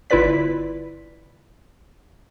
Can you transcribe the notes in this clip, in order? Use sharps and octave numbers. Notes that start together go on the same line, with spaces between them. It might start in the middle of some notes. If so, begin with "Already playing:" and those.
G1 E4 F4 B4 D5 B6